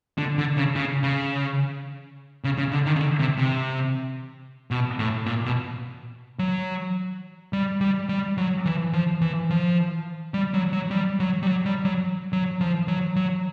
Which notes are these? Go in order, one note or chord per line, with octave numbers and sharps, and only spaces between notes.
D3
D3
C#3
C#3
C#3
C#3
C#3
D3
D#3
C#3
D3
C3
C3
B2
A2
A#2
B2
F#3
G3
G3
G3
F#3
E3
F3
E3
F3
G3
F#3
F#3
G3
F#3
G3
F#3
G3
F#3
F#3
F3
F#3
F#3